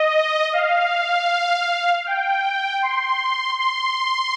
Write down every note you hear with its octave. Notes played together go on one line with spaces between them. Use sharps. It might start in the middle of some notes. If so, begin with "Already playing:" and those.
Already playing: D#5
F5
G5
C6
C6